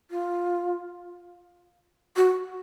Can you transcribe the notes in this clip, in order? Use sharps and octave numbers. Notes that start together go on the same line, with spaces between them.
F4
F#4